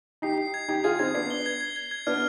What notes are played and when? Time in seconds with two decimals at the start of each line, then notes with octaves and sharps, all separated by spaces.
0.22 D#4 G4 C7
0.38 C7
0.54 G#6
0.68 D#4 G4 G#6
0.84 F4 G#4 G#6
0.99 C4 D#4 G#6
1.15 B3 D4 C7
1.30 G7
1.46 G#6
1.61 G#6
1.76 G#6
1.91 G#6
2.07 B3 D4 F6